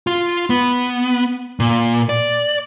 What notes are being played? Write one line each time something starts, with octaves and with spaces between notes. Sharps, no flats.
F4
B3
A#2
D5